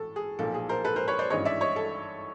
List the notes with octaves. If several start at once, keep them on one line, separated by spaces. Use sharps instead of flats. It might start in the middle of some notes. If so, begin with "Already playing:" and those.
Already playing: A2 E3 A4
G#4
B1 A#2 F3 A#3 A4
G#4
A#4 C5
A4 B4
A#4 C5
B4 C#5
C5 D5
G#1 G2 E3 G#3 C#4 C#5 D#5
D5 E5
C#5 D#5
A4